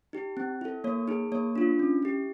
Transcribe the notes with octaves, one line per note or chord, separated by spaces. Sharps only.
D#4 G4
C4
E4 A4
A#3 C#5
D#4 G#4
A#3 C#5
D4 F4
C#4
E4 G4